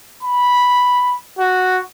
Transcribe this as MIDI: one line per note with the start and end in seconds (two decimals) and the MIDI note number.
0.23 1.16 83
1.39 1.80 66